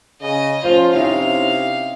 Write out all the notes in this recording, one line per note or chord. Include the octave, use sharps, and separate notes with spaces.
C#3 D#5
F3 C#4 F4 C5 F5
C3 C#4 D#4 E4 F5